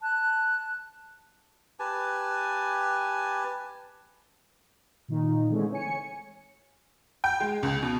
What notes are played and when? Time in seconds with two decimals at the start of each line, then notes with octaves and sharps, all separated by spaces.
0.01 A5 F#6
1.79 G4 B4 G#5 A5
5.08 A#2 D#3 D#4
5.49 D3 E3 G#3 A3 C4 C#4
5.72 C#5 G#5 C#7
7.24 G5
7.40 G#3
7.63 C#2
7.82 B2